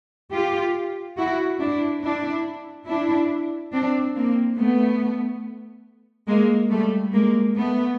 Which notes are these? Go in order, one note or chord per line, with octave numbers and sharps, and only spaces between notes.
F4 G4
E4 F#4
D4 E4
D4 E4
D4 E4
C4 D4
A#3 C4
A3 B3
G#3 A#3
G3 A3
G#3 A#3
A3 B3